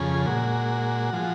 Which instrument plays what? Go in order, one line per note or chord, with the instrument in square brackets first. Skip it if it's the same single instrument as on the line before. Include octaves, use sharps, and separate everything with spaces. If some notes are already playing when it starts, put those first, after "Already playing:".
Already playing: [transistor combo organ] F2 C#3 G#4
A#2 G#3 F#4
F3 G#3